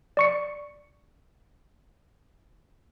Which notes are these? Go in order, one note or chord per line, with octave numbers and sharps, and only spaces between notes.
D5 C#6 C#7